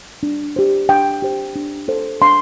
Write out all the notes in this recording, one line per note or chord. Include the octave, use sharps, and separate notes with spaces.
D4
G4 C5
D4 G5
G4 C5
D4
A4 C5
D4 C6